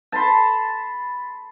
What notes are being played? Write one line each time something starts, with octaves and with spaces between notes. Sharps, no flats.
A5 B5 C6